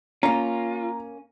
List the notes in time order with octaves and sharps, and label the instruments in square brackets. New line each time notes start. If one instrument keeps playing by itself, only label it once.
[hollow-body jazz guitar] A#3 C#4 [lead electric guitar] F4 [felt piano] A#5